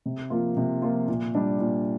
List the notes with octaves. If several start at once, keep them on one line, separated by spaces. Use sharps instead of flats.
C3
F3 A#3 F4
C3
F3 A#3 F4
A#2
G3 D4
A#2